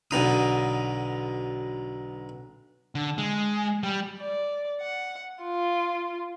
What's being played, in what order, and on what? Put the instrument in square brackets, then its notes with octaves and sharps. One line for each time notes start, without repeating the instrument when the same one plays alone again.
[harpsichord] B1 D3 D#4 D#6
[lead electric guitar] D3
G#3
G3
[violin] D5
F#5
F4